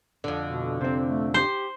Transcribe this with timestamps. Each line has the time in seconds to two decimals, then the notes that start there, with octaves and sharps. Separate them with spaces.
0.24 F2 D3 D4
0.44 B2
0.81 C3 C4 C5
1.06 A3
1.34 G4 C5